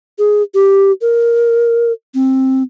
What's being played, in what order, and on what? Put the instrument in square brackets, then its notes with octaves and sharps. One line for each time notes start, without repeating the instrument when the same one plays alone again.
[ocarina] G#4
G4
A#4
C4